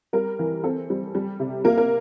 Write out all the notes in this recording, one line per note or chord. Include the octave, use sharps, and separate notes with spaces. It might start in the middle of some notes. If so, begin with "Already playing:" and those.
G3 A#4
E3
C4 A4
G3
G3
C3
A#3 A#4
A#4